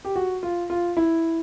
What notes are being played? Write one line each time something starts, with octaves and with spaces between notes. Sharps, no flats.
G4
F#4
F4
F4
E4